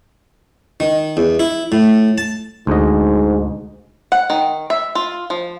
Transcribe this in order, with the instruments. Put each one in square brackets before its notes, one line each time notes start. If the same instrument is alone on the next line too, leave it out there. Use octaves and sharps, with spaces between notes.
[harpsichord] D#3
E2
E4
A2
A5
[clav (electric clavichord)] D2 D#5 [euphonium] G#2
[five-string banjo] F#5
D#3
E5
F4
F3